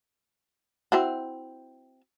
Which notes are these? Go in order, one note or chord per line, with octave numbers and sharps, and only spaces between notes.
C4 E4 F#4